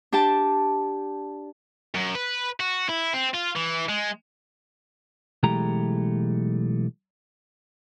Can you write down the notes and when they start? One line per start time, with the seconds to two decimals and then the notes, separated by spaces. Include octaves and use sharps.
0.12 D4 G4 G5 A5
1.95 F#2
2.15 B4
2.60 F#4
2.89 E4
3.13 C4
3.34 F4
3.56 E3
3.89 G#3
5.43 B1 E3 G#3 A3 G4 A#5